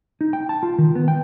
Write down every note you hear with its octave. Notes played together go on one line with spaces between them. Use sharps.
D#4
G5
A5
F4
D#3
B3
G5